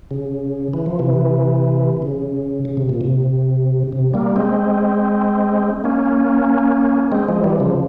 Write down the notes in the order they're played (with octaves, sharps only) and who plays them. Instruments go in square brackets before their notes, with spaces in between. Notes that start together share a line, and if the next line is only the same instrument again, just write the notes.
[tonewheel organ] C#3
E3
F3
C3 E3
C#3
C#3
C3
A#2
C3
C3
G3 A#3
G#3 C4
A#3 C#4
G#3 C4
F3 G#3
E3 G3
C#3 F3